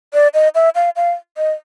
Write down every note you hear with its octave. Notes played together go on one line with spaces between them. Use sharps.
D5
D#5
E5
F5
F5
D#5